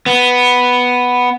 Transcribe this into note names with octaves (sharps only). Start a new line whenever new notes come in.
B3